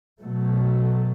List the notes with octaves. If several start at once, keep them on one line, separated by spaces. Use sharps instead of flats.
B2 F#3 A3